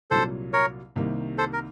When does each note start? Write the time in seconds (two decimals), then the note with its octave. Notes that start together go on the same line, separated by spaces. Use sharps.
0.11 C2 A#2 F#3 A4 C5
0.53 A#4 C#5
0.96 C2 C3 D#3 A#3
1.38 A4 C5
1.53 A#4